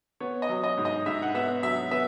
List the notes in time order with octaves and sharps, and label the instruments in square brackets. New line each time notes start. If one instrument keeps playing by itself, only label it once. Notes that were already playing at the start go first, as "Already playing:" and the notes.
[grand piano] B3 C#5
D#5
F#3
D#5
G#2
D#5
G#2 E5
F#5
B3 E5
F#3 E5
B3 E5